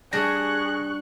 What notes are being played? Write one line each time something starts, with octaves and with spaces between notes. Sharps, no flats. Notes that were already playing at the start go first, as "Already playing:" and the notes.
G3 D4 G#4 C#6 F#6 A#6